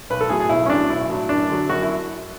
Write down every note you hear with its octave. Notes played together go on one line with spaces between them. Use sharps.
B1 B4
A4
A2 F#3 G#4
G#4
B1 E4
C#4
A2 F#3 D4
B1 E4
A2 F#3
F#2 D4
D3 F#3
F#2 F#4
E4